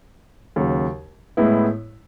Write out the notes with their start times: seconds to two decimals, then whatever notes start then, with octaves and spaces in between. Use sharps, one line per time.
0.56 D#2 C#3 F#3
1.37 A2 G#3 B3 E4